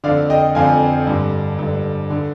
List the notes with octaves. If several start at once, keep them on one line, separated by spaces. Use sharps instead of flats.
F2 D3 D5 F5
D#5 G5
F2 D3 F5 G#5
G2 D3
G2 D3
D3